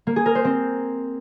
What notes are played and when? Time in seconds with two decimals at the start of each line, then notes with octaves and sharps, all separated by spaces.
0.07 A#3
0.16 G#4
0.26 A#4
0.35 C5
0.45 C4